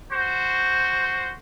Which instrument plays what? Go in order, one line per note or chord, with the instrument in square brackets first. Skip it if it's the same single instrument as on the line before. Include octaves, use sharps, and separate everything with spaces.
[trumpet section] F#4 C5